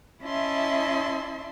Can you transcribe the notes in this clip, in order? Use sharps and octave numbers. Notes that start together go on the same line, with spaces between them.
C#4 E4 D#5 E5 A5 C6